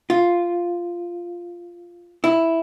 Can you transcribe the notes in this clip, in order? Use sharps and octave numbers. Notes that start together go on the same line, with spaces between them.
F4
E4